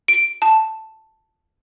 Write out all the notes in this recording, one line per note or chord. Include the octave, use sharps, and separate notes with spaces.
D7
A5